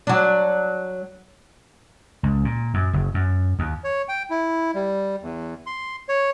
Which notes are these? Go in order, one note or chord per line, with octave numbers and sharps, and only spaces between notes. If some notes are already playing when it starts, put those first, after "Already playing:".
F#3 D4
C#2
A#2
F#2
F#1
F#2
D#2
C#5
G5
E4
G3
E2
C6
C#5